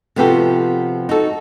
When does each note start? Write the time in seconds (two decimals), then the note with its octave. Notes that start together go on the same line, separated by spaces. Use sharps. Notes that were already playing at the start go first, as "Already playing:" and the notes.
0.16 C3 F3 B3 F#4 G4 A4
1.09 D#4 F#4 A4